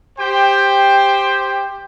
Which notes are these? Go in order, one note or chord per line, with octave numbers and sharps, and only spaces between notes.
G4 C5 G5